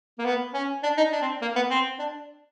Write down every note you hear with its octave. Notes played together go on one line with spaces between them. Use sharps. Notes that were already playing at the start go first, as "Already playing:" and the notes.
A#3
B3
C#4
D4
D#4
D4
C4
A#3
B3
C4
D4